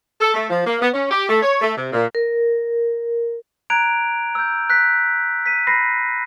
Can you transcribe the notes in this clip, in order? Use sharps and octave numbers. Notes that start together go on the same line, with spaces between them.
A4
A3
F3
A#3
B3
C#4
G4
A3
C#5
A3
C3
A#2
A#4
A#5 F#6 G#6 D7 F7
E6 G6
F#6 B6
B6 D#7
B5 A#6 C7